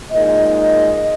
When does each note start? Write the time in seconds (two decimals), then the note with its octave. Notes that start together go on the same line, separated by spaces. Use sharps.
0.12 A#2 G#3 D#4 D#5